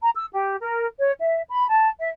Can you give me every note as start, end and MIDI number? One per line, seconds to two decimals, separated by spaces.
0.02 0.10 82
0.15 0.26 88
0.34 0.56 67
0.61 0.87 70
0.99 1.14 73
1.21 1.41 76
1.50 1.67 83
1.70 1.89 81
2.00 2.09 76